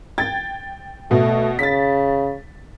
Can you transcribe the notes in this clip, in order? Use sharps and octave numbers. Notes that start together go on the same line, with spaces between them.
G5 G#6 A6
B2 A3 F#4
C#3 A6 B6